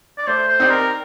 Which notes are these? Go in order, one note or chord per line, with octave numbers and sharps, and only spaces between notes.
D5
A3 C5
C5
C4 D#4 G4 D5
A#4